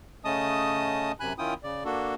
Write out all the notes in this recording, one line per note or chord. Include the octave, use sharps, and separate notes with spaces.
C#3 A3 C#4 D#5 A5 D#6
F#2 C3 G#5 B5 F#6
D#3 C#4 E4 F4 G5 D#6
C#3 D5
A#3 D4 F#4 A4